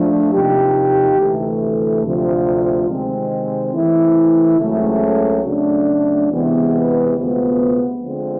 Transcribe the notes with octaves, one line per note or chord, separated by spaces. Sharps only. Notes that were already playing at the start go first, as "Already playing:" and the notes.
Already playing: F3 A3 D4
C3 F3 A#3 D#4 G4
D2 C3 E3 A3
D2 C3 F3
C3 D#3 G#3 C4
E3 A3 C4 E4
C#2 C#3 F#3 A3 C4
C#3 F#3 A3 D4
E2 C3 E3 G#3 B3
D2 C3 F3 G#3 B3
D3 F3 G#3 C4